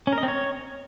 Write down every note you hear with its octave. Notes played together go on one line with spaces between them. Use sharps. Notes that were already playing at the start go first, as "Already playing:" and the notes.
C#4
A#4
D#5
C4
C#5